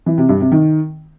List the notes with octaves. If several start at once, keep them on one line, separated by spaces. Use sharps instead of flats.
E3
C3
G2
C3
D#3